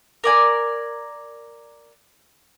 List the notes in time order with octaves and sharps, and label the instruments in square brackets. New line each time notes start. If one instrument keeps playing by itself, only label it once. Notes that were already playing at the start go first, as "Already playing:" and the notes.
[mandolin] A#4 D5 G#5